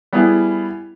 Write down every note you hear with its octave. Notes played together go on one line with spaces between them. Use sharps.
G3 B3 E4 G#4